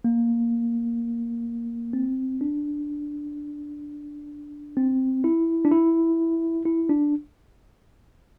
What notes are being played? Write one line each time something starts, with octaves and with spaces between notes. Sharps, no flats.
A#3
C4
D4
C4
E4
D4
E4
E4
D4